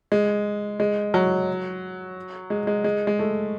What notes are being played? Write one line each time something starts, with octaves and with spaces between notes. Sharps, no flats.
G#3
G#3
F#3
G#3
G#3
G#3
G#3
A3